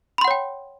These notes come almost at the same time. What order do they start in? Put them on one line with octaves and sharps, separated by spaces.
B5 C6 F#5 C#5 G5